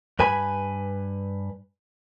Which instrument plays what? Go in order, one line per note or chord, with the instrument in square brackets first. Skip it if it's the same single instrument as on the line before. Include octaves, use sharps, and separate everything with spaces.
[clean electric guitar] G2 B4 G#5 B5